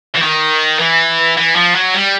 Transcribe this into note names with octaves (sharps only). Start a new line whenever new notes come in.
E3
D#3
E3
E3
F3
F#3
G3